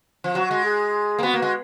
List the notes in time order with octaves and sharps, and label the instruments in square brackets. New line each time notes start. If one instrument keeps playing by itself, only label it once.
[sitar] F3
[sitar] F#3 [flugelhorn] F#4
[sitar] G#3
[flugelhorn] G#4
[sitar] A#3
[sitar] B3 [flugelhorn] F#4
[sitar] A#3
G#3